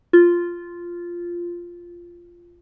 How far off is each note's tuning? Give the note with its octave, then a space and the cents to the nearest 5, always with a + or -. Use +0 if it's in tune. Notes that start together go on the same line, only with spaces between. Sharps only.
F4 -5